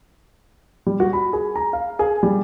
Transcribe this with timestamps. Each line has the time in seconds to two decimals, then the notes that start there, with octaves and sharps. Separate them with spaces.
0.87 G3
1.00 F#4
1.13 B5
1.33 G#4
1.56 A#5
1.73 F5
1.99 G#4
2.23 G3